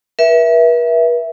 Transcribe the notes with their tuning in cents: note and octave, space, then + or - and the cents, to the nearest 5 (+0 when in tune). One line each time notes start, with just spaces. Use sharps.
B4 -45 E5 +0